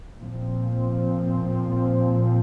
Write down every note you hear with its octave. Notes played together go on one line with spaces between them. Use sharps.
A#2 F3 C4